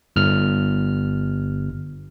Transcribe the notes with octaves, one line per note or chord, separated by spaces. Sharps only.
G1 F6